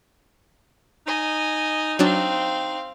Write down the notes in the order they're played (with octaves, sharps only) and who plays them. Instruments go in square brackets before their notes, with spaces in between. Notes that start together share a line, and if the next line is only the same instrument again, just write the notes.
[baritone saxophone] D#4 [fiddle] D#5 G#5
[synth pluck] F#3 D4 [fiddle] C4 F5